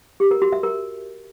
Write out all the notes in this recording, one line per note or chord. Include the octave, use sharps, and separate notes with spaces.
G4
A#4
F#4
E5
A#4